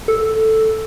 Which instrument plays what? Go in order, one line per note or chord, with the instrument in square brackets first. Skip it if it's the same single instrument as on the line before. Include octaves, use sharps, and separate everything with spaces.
[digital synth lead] A4